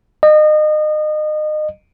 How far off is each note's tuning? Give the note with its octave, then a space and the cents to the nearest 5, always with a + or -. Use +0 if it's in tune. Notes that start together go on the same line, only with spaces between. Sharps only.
D#5 -30